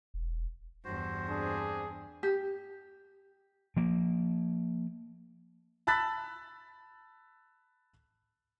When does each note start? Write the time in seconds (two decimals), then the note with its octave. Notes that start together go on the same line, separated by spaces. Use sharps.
0.14 E1
0.85 E2 G2 F#4 C5
1.29 C4 D4 G#4
2.23 G4
3.77 F3 A#3
5.87 A5 B5 E6 F#6 A6 B6